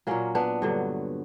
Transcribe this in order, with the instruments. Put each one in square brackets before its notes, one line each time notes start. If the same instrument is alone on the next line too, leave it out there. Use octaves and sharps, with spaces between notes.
[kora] A#2 F#3 A#3 C#4
B3 D4
G2 D3 F#3